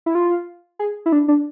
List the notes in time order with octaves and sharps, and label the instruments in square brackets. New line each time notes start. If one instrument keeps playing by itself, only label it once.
[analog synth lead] E4
F4
G#4
E4
D4
D4